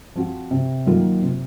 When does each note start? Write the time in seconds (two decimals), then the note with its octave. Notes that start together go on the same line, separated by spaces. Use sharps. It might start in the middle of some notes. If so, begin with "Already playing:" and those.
0.16 F3 C4 F#4
0.51 C3
0.86 D#3 F#3 A#3 F4
1.22 C3